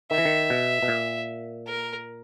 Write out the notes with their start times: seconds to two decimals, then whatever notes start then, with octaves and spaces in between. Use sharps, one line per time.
0.11 D#3 E5
0.18 E3
0.25 D#3
0.50 B2
0.83 B2
0.88 A#2
1.67 A#4